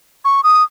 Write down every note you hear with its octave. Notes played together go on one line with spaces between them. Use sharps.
C#6
D#6